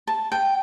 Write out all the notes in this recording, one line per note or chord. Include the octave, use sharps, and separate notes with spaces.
A5
G5